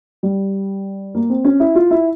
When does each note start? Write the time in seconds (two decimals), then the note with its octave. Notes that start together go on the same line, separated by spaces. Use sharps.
0.23 G3
1.15 A#3
1.30 C4
1.45 C#4
1.60 E4
1.75 F4
1.91 E4